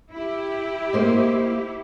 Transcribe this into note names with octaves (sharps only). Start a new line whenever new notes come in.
E4 G4
A#3 C5 D#5